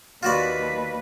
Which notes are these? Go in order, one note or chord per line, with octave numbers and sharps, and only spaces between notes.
D#2 F4 F#4 B4 D5